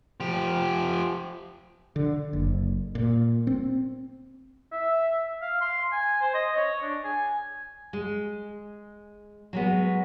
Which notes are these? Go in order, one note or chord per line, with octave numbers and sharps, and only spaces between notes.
F3 G4
D3
F#1
A#2
C4
E5
F5
C6
G#5
C5
D#5
C#5
D4
G#5
G#3
F#3 G#3 B3